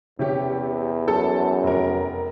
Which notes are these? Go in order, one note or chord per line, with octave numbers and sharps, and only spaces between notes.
E2 C3 C#4 G4
F#2 A4
F1 A#4